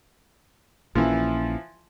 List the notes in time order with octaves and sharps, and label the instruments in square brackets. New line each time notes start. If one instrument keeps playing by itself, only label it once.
[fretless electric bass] A#1 A#3 C#4 [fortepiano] E3 F3